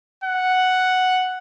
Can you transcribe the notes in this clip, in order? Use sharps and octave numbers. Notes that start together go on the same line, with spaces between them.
F#5